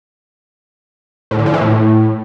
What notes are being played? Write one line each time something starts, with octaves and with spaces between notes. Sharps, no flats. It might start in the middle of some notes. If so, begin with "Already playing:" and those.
A2
D3
F3
E3
A2